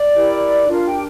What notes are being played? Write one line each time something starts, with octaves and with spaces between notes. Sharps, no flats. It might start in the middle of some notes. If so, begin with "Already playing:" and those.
Already playing: D5
E4 G4 A#4
D4 F4 G4 A#4 F5
G4 G5